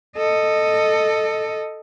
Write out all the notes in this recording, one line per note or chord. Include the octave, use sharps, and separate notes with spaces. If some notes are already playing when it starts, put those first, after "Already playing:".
A4 D#5